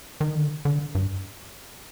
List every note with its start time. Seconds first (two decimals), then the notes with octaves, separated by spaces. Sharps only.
0.21 D#3
0.35 D3
0.65 D3
0.95 G2